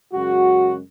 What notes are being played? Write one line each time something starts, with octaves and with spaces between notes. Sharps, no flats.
F#2 C#3 G#3 F#4